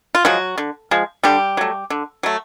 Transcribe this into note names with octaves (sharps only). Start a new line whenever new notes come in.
F4
F3 F#3 G#3 F#4
D3
F3 G#3
D3 G3 G4
F#3 A3
D3
F#3 A3